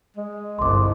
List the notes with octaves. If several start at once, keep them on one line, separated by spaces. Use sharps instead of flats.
G#3
G1 C2 C6 D6